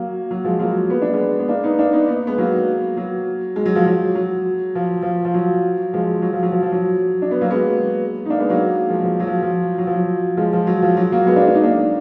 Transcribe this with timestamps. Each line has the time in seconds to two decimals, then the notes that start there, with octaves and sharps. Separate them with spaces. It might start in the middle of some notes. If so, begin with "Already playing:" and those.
Already playing: F#3 A#3
0.31 F#3
0.44 F3 G#3
0.59 F#3 A#3
0.90 B3
1.02 D4
1.14 G#3 B3
1.39 B3
1.48 A#3 D4
1.64 B3 D#4
1.79 A#3 D4
1.93 B3 D#4
2.08 B3 D#4
2.27 G#3 B3
2.38 F#3 A#3
2.97 F#3
3.56 G#3
3.66 F#3
3.75 F3
3.87 F#3
4.15 F#3
4.75 F3
5.02 F3
5.25 F3
5.34 F#3
5.94 F3 G#3
6.22 F#3
6.33 F3
6.43 F#3
6.52 F3
6.63 F3
6.72 F#3
7.22 D4
7.31 B3
7.41 F#3 A#3
7.51 G#3 B3
8.26 D#4
8.30 A#3 D4
8.40 G#3 B3
8.49 F#3 A#3
8.90 F3 G#3
9.04 F3
9.20 F#3
9.27 F3
9.43 F3
9.78 F#3
9.87 F3
9.94 F#3
10.37 F3 G#3
10.53 F3
10.67 F#3
10.82 F3
10.97 F#3
11.12 F#3 A#3
11.27 G#3 B3
11.36 A#3 D4
11.47 D4
11.54 D#4
11.63 A#3 D4